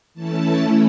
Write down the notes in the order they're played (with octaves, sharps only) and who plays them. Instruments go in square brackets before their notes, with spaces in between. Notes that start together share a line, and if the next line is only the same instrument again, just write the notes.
[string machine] E3 A3 C#4 E4 A5